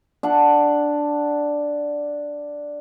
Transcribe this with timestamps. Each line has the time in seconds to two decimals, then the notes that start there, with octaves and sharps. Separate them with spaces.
0.23 D4 F#5